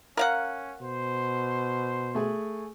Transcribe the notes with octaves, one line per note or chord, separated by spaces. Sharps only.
C#4 A#4 F5 F#5
B2 C5
A3 G#4